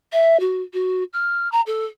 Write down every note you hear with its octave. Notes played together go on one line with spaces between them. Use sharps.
E5
F#4
F#4
F6
A#5
A4